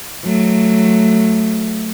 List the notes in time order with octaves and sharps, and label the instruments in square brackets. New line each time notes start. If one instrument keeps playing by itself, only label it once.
[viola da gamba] F#3 A3